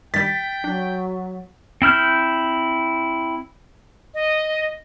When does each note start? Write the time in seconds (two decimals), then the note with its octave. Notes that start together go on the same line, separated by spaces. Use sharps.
0.14 G2 D#3 G3 G5 A6 B6
0.64 F#3 D4
1.82 C4 E4 F6 G6
4.14 D#5